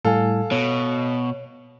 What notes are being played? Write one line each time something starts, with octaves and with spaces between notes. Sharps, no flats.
A2 G3 A4 F5 G#5
B2 C#5